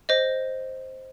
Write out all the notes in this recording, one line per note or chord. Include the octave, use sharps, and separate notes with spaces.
C5 D#5